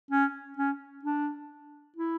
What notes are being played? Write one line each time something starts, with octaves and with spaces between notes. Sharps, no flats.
C#4
C#4
D4
E4